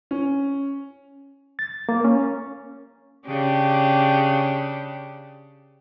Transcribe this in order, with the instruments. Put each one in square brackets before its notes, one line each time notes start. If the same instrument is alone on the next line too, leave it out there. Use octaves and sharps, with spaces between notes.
[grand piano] C#4
[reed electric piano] A6
A#3
C#4
[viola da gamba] C#3 D4 G4